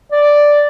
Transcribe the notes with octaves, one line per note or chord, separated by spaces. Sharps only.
D5